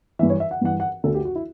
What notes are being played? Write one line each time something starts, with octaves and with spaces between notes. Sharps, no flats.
G2 E3 E5
C#5
E5
F#5
G2 E3 F#5
F#5
D2 D3 A4
G4
F#4
E4